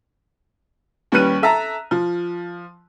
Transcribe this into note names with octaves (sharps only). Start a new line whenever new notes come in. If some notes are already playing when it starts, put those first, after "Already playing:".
D#2 G3 C#4 B4 F#6 D#7
A4 E5 A5 A#5
F3